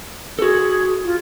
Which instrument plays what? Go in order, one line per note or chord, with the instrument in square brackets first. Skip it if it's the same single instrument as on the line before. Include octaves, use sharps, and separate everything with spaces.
[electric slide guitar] F#4 A4 [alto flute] G#4
[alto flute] F4